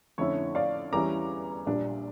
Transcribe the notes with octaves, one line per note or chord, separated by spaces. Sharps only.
F2 D3 A3 C#4 E4 C#5
D5 F5
E2 E3 G3 C#4 E4 A#5 D6
A#1 A#2 G3 D4